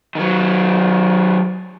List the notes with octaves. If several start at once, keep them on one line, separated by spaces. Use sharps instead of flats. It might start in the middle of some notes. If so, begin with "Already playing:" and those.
D#3 F#3